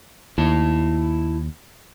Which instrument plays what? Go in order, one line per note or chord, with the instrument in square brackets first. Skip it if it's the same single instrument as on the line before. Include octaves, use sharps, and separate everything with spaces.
[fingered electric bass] D#2 [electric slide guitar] E4 A5